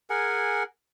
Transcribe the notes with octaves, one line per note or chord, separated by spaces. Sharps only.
G#4 A#4 F#5 G#5